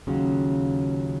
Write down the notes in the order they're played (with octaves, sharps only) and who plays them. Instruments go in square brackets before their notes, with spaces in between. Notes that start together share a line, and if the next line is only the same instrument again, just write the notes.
[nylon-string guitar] D#2 C#3 F#3 C#4 F4